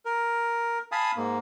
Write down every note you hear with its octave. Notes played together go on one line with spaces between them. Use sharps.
A#4
F5 G#5 A5 B5 D#6
G#2 A#3